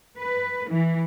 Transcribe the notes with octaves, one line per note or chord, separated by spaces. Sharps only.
B4
E3